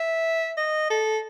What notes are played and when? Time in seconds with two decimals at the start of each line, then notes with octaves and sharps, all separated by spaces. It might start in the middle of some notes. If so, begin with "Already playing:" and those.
Already playing: E5
0.57 D#5
0.90 A4